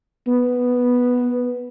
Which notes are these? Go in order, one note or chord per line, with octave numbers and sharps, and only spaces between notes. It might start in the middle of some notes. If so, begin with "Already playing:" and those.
B3